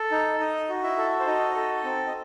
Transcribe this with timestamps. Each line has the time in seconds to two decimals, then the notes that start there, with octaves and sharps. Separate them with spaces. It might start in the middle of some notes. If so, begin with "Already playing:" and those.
Already playing: A4
0.11 D#4
0.40 D#4 D#5
0.69 F#4
0.83 E4 E5
0.98 A4
1.20 C5
1.26 D#4 F#4 D#5
1.55 A4
1.84 C4
2.07 D#5